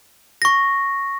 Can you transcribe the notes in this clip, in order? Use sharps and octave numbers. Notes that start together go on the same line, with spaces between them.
C#6 A#6